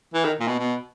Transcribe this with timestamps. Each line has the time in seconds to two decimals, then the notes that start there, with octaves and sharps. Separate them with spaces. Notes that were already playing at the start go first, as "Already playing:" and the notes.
0.14 E3
0.25 D#3
0.40 A#2
0.47 B2
0.59 B2